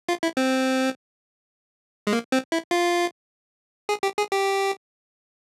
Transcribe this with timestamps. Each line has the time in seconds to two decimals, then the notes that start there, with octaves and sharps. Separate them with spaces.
0.09 F4
0.23 E4
0.37 C4
2.07 G#3
2.13 A#3
2.32 C4
2.52 E4
2.71 F4
3.89 G#4
4.03 G4
4.18 G#4
4.32 G4